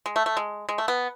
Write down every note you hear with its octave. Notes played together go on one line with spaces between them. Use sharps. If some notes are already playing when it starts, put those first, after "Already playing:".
G#3
A3
A3
G#3
G#3
A3
B3